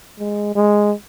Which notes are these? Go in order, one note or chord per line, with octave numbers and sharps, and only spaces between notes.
G#3
G#3